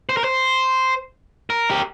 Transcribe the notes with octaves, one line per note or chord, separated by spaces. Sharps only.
C5
A#4
C5
A#4
G4